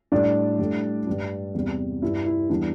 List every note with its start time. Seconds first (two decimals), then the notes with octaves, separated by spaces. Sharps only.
0.12 A2 G3 D4 D5
0.59 A2 G3
1.07 G2 G3
1.54 E2 C3 G3
2.02 G2 G3 E4
2.26 E4
2.49 E2 E3 G3 D4